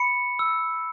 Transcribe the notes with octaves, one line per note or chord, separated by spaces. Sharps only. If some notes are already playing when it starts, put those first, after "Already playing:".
Already playing: B5 C#7
E6